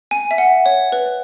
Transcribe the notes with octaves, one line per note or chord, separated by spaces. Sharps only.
G#5
E5
F#5
C#5
B4